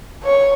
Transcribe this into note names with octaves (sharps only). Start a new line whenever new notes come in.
C#5